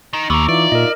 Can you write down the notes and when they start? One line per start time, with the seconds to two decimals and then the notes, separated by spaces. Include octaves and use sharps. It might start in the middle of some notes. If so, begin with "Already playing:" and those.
0.13 D#3 D#4
0.30 D#2 B3 A#4 C#6 D6 E6
0.49 E3 D#4 F4 D5 E5
0.72 A#2 A#4 D#5